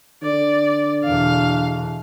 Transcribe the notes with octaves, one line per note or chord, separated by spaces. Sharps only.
D3 D5
E2 B2 F5